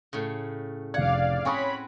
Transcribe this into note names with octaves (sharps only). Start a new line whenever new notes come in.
A2 C#3
F1 D5 F5 F#5 G#6
C4 C#4 F#4 C#5 G#5 B5 C#6 D#6